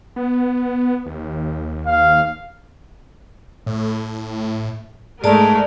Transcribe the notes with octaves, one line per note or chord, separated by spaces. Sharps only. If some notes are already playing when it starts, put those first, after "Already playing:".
B3
D#2
F5
A2
G#2 G#3 A3 A#4 D5 A5